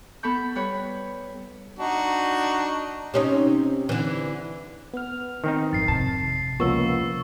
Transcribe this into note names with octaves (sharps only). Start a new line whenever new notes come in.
B3 A4 B5 C#6 G6
G3 B4 C#5
D4 D#4 F#4
C3 C#4 D#4
D3 E3
B3 F6
D#3 C4 D#4
G#1 F2 A6 C7
C3 A5
C#2 F3 A#3 B3 C#6 E6